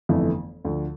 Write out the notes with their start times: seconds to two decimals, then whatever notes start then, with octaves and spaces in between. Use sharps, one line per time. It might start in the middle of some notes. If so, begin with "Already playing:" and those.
0.09 G1 F2 E3 A3
0.65 D2 D3 F3